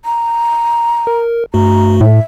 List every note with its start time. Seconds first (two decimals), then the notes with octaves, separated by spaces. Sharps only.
0.05 A#5
1.07 A#4
1.54 G2 A3 F#4 A#5
2.01 A2 E5